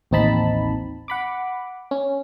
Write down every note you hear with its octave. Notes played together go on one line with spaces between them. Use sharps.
A1 D#2 C4 D#4 A5 B5
F#5 B5 D6
C#4